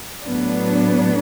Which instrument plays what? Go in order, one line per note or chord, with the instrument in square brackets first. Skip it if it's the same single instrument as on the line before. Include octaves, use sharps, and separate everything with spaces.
[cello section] A2 F#3 B3 D4